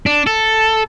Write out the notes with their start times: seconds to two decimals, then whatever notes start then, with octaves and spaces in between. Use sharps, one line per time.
0.06 D4
0.27 A4